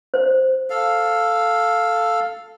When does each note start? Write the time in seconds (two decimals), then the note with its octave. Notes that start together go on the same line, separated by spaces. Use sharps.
0.14 C5
0.70 A4 F5